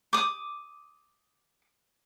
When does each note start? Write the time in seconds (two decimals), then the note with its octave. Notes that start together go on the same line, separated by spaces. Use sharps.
0.13 D6 D#6